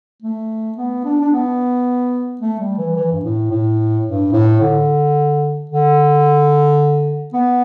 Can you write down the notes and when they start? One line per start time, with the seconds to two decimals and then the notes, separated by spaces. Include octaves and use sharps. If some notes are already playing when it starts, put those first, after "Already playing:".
0.22 A3
0.77 B3
1.05 D4
1.21 D4
1.32 B3
2.41 A3
2.60 G3
2.78 E3
2.96 E3
3.13 G2
3.24 A2
3.51 A2
4.06 G2
4.33 A2
4.61 D3
5.69 D3
7.34 B3